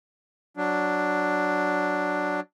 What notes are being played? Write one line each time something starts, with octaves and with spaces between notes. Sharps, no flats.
F#3 D4